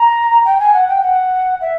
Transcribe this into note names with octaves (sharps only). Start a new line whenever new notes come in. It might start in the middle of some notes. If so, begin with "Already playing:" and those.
Already playing: A#5
G5
G#5
F#5
G5
F#5
E5